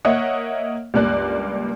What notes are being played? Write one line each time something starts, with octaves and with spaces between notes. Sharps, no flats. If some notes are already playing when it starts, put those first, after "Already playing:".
A#3 C#5 D#5 E5 F#5
C#2 G2 A#3 D5 F#6